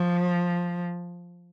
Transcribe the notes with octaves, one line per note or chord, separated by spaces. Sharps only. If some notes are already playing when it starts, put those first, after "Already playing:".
Already playing: F3